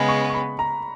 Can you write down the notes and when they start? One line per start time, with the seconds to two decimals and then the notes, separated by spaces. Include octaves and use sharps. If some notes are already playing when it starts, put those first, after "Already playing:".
Already playing: C#3 G#3 B3 B5
0.08 C#6
0.29 C#6
0.34 B5
0.59 A#5